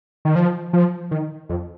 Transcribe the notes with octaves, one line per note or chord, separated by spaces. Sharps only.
D#3
F3
F3
D#3
F2